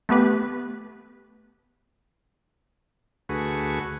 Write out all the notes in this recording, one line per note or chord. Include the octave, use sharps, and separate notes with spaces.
A3 B3 G4 B4
D2 A3 F#4 G#4 B4 C#6